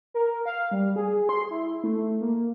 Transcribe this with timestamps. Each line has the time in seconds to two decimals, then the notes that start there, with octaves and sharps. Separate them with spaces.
0.14 A#4
0.46 F5
0.71 G3
0.96 G#4
1.29 C6
1.51 E4
1.84 A3
2.21 A#3